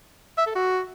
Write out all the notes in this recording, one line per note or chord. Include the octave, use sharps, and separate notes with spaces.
E5
A4
F#4